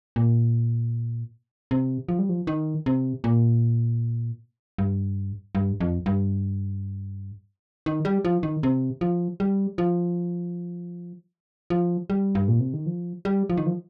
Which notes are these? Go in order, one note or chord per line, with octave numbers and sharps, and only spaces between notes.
A#2
C3
F3
G3
F3
D#3
C3
A#2
G2
G2
F2
G2
D#3
G3
F3
D#3
C3
F3
G3
F3
F3
G3
G2
A#2
C3
D#3
F3
G3
F3
D#3
F3